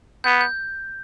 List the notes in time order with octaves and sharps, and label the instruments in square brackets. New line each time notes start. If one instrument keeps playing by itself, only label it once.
[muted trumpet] B3 [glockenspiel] G6
[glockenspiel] G6